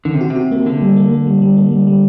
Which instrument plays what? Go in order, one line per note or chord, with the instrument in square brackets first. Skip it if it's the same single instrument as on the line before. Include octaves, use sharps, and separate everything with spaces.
[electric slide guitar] D3 [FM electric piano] D#3
[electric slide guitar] C3
[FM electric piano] F#4
[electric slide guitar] C3
[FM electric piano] F#4
A#3
[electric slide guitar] D3 [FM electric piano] A#3
[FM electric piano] G3
A#3
A#3
G3
G3
A#3
G3
G3